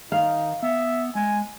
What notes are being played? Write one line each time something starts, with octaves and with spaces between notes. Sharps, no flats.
D#3 D#4 F5
B3 E5
G#3 G#5